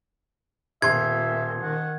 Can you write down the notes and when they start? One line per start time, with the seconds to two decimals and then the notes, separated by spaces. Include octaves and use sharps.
0.82 D#1 A#2 B3 E5 C6 G#6
1.63 D#3 F#5